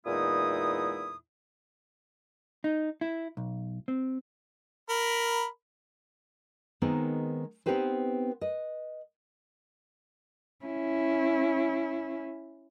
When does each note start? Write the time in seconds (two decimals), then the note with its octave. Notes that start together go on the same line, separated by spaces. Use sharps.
0.06 E2 A#2 G#3 D#4 E4 D#6
2.64 D#4
3.01 E4
3.37 B1
3.88 C4
4.89 A#4 B5
6.82 D#3 G#3 B3 C4 D#4 A#4
7.66 B3 C4 D#4 G4 B4 C5
8.41 B4 D#5
10.65 C#4 E4